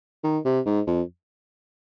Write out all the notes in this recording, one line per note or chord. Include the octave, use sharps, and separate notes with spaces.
D#3
C3
G#2
F2